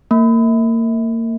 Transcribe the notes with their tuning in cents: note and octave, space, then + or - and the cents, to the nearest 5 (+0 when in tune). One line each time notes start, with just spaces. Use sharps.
A#3 -30